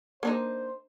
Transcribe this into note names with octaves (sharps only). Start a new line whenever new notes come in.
A#3 D4 D#4 C5